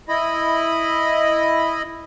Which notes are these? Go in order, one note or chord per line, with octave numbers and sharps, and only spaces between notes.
E4 D#5 B5